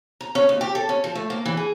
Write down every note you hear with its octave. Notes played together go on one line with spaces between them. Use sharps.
A#5
C#4
D#2
G4
A4
C#4
F3
A3
A#3
E3
G#4